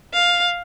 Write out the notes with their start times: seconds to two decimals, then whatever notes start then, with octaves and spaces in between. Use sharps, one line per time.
0.14 F5